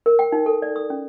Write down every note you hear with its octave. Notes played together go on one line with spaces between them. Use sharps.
A#4
G5
D#4
A4
D5
D#6
C#4